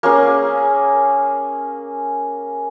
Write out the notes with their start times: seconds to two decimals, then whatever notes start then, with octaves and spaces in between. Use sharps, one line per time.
0.03 A#3 C#4 G#4